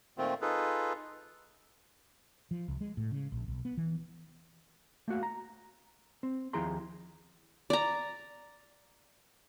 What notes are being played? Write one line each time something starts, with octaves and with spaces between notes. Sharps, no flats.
A#2 D#3 A3 C4 F4
D#4 F4 G#4 A4 B4
F3
C2
G#3
A2
C#3
A#1
B1
B3
E3
A3 A#3 F#4 F5
A#5
C4
D#2 F3 E4 G#4 A#5 C6
D5 A#5